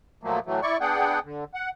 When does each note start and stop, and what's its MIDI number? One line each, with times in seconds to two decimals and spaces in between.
0.23 0.39 46
0.23 0.39 53
0.23 0.39 54
0.23 0.39 57
0.23 0.39 58
0.46 0.61 45
0.46 0.61 52
0.46 0.61 54
0.46 0.61 57
0.62 0.78 64
0.62 0.78 74
0.62 0.78 85
0.81 1.19 59
0.81 1.19 62
0.81 1.19 68
0.81 1.19 78
0.81 1.19 79
1.24 1.44 50
1.54 1.70 78